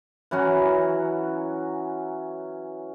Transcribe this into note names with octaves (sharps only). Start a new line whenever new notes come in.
E3 F#3 C#4 F#4